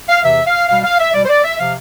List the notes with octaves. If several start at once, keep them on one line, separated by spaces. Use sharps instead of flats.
F5
E2 C3 E3 E5
F5
B2 G3 F5
F5
E5
B2 G3 D5
C5
D5
E5
C3 F3 F5